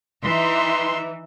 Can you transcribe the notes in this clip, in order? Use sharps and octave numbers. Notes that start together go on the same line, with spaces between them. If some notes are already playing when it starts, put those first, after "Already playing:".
E3 D#4 E5 C6